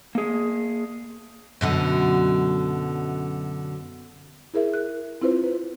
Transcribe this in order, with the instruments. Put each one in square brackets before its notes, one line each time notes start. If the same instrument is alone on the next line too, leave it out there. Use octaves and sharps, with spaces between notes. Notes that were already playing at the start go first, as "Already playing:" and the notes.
[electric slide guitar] A#3 G#4
[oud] F#2 B2 D3
[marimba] E4 G#4 A#4 E5
F#6
C4 E4 F4 B4 C5
B4